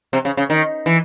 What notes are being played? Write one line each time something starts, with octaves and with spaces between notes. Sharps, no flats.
C3
C#3
C#3
D#3
E3